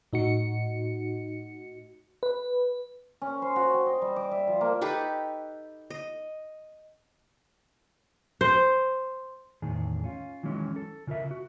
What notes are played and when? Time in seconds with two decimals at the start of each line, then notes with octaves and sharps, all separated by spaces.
0.13 A2 D#4 F#4 C#7
2.23 B4
3.22 C#4
3.42 C5
3.56 F#4
3.74 G5
3.86 D#5
4.02 G3
4.16 D6
4.31 E5
4.47 F3
4.61 A#3
4.81 D#4 G4 A4 B4
5.90 D#5
8.41 C5
9.62 E2 A2 D#3 G#4
10.04 C#4 F4
10.43 D#3 E3 F#3 G#3 C#4
10.76 A4
11.07 C#3 F4 A#4 E5
11.31 F#4